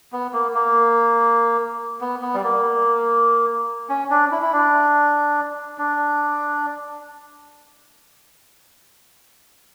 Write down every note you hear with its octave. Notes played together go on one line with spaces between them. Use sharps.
B3
A#3
A#3
B3
B3
G3
A#3
C#4
D4
E4
E4
D4
D4